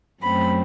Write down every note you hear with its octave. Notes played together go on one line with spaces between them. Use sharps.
F#2 F#3 A3 C4 B5